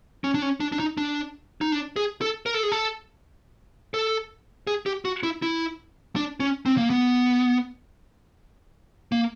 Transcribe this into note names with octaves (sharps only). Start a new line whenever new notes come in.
C#4
D4
C#4
D4
D4
D#4
D4
D#4
D4
G#4
A4
A#4
A4
G#4
A4
A4
G#4
G4
F#4
E4
E4
D4
C#4
C4
A#3
B3
A#3